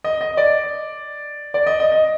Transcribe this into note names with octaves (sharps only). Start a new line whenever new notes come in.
D#5
D#5
D5
D5
D#5
D#5
D#5